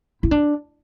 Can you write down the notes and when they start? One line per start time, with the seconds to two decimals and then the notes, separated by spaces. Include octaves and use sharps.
0.23 E4
0.31 D4